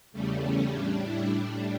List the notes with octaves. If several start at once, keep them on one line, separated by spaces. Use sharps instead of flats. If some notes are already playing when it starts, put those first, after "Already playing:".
E2 C#3 G3 A3
C#4
A2 G3 D4
E4
A2 G3 D4